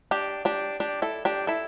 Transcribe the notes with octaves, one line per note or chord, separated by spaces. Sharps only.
D4 G4
D4 G4
D4 G4
E4 A4
D4 G4
E4 A4